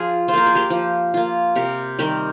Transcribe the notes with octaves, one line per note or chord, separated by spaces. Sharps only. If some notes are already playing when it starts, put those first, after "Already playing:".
Already playing: F3 F4 G#4
F4 C5
A#3 A#4
G#4
G4 A#4
F3
A#3 F4
C3 G4 A#4
D#3 G3 G4 A#4